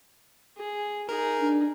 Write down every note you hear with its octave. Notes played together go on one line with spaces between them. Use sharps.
G#4
D#4 G#4 A#4
D4